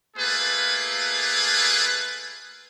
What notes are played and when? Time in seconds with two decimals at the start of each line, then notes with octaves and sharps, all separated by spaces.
0.16 A3 A#3 F4 G#4 A4 B4